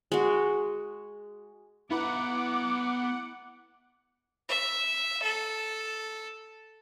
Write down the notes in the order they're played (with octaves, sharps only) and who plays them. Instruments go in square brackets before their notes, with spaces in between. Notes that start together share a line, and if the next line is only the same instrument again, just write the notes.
[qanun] G#3 F#4
[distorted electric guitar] B3 A#5 [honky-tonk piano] E4 B4 [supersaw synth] F#5 [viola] D6
[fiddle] E5
A4